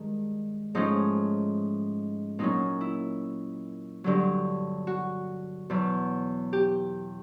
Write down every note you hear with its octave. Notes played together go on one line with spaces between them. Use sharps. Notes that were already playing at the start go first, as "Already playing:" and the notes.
Already playing: G2 D#3 G#3
G#2 F3 A3 C#4 D#4
A#2 F#3 A#3 C#4 D#4
E4
G2 D3 F#3
F#4
E2 B2 F#3
G4